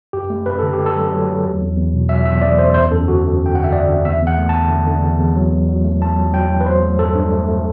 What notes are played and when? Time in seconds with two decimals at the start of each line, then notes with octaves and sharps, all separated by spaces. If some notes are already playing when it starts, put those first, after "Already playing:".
0.13 F#2 G4
0.30 A3
0.46 F#2 B4
0.59 D3 A4
0.73 G4
0.78 A3
0.86 A4
0.96 F#3
1.12 F#3
1.28 F#3
1.45 E2
1.60 E2
1.76 E2
1.94 B2
2.09 F#3 E5
2.25 E2 E5
2.42 E2 D5
2.59 E2 C5
2.74 F#2 C5
2.91 F#2 A4
3.07 D3 F#4
3.23 F#2
3.40 F#2
3.46 G5
3.55 D3 F#5
3.64 E5
3.72 F#2 D5
3.89 D3
4.05 E2 E5
4.22 E2
4.27 F#5
4.38 A3
4.49 A5
4.55 E2
4.70 D3
4.87 D3
5.03 E2
5.19 E2
5.36 F#3
5.52 E2
5.69 F#3
5.84 A3
6.01 E2 A5
6.18 F#3
6.34 F#3 G5
6.51 E2
6.61 B4
6.66 F#3 C5
6.83 A3
6.99 G2 A4
7.15 G2
7.32 A3
7.48 A3